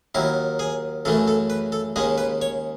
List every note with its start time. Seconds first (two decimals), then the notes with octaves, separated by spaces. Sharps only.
0.15 D#2 D#3 F#3 E4
0.59 G#4
1.05 F#2 C#3 E3 A3 A4
1.28 A4
1.50 B4
1.72 A4
1.96 D#2 C#3 G#3 G#4
2.18 B4
2.42 C#5